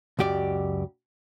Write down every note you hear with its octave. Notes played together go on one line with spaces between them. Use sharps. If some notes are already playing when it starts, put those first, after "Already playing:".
C#2 F#2 G4 D5